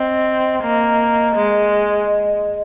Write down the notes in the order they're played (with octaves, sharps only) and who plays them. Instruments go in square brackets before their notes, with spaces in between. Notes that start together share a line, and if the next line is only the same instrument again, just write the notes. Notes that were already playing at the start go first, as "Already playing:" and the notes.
Already playing: [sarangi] C4 [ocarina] D#5
[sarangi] A#3
G#3